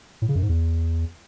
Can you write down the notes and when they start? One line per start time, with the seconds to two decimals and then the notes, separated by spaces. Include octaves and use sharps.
0.22 A2
0.29 C#3
0.35 F#2
0.42 G#2
0.49 E2